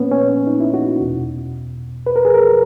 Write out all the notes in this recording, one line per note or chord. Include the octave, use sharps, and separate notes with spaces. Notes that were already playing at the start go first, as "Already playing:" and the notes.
Already playing: A#2 A#3 B3 C#4
C#4
D#4
E4
F#4
E2 B2
B4
A#4
G#4
A#4